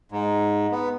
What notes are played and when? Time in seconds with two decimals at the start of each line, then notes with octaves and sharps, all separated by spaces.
0.12 G#2
0.72 B3